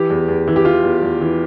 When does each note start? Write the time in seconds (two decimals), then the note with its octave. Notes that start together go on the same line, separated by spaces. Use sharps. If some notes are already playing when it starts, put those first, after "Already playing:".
Already playing: E3 G4
0.10 E2
0.28 E2
0.48 E3
0.56 G4
0.65 E3 F4
0.84 E2
1.02 E2
1.21 E3